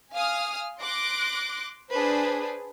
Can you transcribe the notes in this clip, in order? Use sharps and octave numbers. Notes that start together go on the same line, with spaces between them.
F5 G#5 D#6 F6
C6 D6 F#6 A#6 D7
D4 G#4 B4 C5